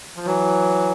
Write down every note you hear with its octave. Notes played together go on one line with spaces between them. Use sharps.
F3
E3 F#3